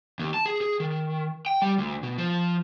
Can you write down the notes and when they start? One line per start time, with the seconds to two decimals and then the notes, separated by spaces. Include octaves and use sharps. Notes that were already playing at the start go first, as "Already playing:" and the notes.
0.19 D#2
0.34 A5
0.46 G#4
0.61 G#4
0.80 D#3
1.46 G5
1.62 G3
1.78 D2
2.03 B2
2.18 F3